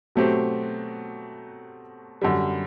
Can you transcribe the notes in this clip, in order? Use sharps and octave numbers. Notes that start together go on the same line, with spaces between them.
B2 F#3 A3 C4 G4
F#2 D3 G3